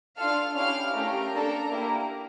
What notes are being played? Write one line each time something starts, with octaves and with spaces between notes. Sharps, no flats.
D4 F4 A4 F5 F6
C#4 E4 G4 F5 F6
A3 C#4 G4 A#4 A#5
A#3 D4 A4
A#3 E4 G4